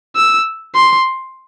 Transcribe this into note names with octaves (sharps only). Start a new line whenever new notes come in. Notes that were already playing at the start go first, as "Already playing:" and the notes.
E6
C6